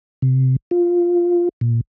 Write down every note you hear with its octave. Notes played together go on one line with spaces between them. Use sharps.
C3
F4
A#2